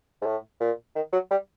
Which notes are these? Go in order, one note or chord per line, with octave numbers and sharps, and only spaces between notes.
G#2
A2
A#2
D#3
F#3
G3